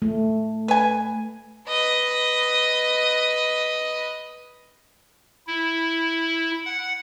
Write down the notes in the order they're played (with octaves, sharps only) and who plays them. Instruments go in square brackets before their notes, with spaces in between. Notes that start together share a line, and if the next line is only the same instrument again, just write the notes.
[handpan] A3
[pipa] B4 G#5
[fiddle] B4 D#5
[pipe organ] E4
F#5